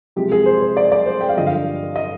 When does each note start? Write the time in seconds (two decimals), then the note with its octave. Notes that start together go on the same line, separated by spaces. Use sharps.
0.16 C3 F3 G#3 G4
0.32 G#4
0.46 C5
0.61 C5
0.77 D5
0.92 D5
1.06 C5
1.21 G5
1.29 F5
1.37 G2 D3 F3 D#5
1.47 F5
1.96 D#5